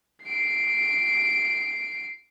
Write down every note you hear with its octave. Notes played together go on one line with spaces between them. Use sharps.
C7 D7